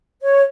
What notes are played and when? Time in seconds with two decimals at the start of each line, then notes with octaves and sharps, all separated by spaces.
0.22 C#5